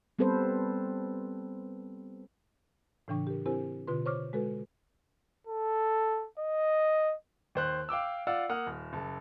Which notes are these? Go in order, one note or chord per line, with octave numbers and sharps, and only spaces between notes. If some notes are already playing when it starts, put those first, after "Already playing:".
G3 B3 C4 A4 B4 C5
A2 C#3 E3 D4 G5 C#6
G4 A#4
C4 E4 G4 A#4 C5 G#5
B2 D3 F4 B4 C6
C5 C#5 C#6 D6 F6
G#3 F#4 A4 B4
A4
D#5
D#2 C5 F#6
F5 G5 D6 E6
F4 D5 F5 F#5 E6
A#3 F#5 D#6 F6
D#1
F#1 A5